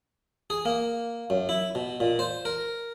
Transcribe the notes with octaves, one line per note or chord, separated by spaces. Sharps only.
G#4
A#3
F#2
E4
B2
A#2
C5
A#4